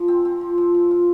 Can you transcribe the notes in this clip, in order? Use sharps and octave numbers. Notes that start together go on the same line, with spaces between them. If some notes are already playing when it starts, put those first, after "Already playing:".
Already playing: F3
C4
C4
F3
F3
F3
F4